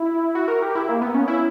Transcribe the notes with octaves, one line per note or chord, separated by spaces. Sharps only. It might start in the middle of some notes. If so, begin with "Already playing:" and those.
Already playing: E4
F#4
A#4
G4
E4
A#3
B3
C#4
E4